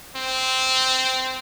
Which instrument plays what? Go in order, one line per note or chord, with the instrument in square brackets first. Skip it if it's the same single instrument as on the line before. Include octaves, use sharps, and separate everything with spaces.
[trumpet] C4